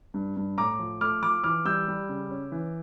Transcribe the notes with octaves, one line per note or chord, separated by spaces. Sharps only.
G2
G2
A2 A#5 D6
F3
A3 D6 F6
F3 D6 F6
E3 D6 F6
G3 E6 G6
G3
C#3
C#4
E3